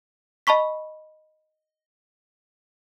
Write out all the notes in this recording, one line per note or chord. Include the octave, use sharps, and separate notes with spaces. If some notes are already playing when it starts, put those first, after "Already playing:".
D#5 A5 B5 C#6 B6